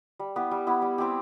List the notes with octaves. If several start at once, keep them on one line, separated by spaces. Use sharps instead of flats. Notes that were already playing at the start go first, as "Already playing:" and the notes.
G3
B3 E4 G4
G3
B3 E4 G4
G3
C4 E4 G4